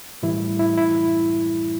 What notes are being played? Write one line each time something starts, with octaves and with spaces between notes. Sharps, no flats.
A2 E3 G3 E4
E4
E4